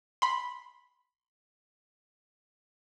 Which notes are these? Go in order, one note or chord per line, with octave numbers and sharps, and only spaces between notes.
B5 C6